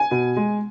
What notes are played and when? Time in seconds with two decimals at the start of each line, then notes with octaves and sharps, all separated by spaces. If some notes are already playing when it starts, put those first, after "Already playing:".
Already playing: G#5
0.11 B2
0.36 G#3